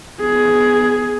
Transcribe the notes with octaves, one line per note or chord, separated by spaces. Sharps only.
B3 G#4